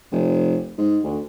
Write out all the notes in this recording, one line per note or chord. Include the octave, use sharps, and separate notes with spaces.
F1
G#2
D2